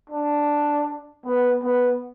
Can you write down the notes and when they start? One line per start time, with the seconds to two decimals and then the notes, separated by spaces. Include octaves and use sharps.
0.10 D4
1.25 B3
1.63 B3